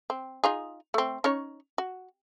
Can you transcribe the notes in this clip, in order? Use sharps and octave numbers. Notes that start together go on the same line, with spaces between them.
C4
D#4 F4 G#4
A3 C4
C#4 D#4 C#5
F#4